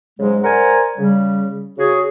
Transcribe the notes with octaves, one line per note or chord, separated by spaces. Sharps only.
G#2 C#3 F#3 G#3
A#4 C5 D5 F#5 G#5 A#5
C#3 G3
C#3 F#4 G#4